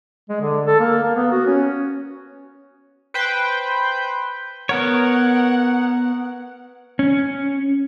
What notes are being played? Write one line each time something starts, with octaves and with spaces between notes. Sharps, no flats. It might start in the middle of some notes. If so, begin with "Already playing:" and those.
G#3
D3
A4
A#3
A#3
B3
F#4
C#4
B4 C5 G5
B3 A#4 C#5 F#5
C#4